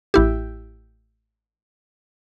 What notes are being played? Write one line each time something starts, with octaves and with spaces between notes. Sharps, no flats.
A1 E4 G4